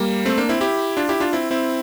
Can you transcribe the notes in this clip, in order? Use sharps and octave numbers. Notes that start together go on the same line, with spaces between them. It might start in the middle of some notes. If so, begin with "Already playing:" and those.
Already playing: G3 A#3
A3 C4
A#3 D4
C4 E4
E4 G4
D4 F4
E4 G4
D4 F4
C4 E4
C4 E4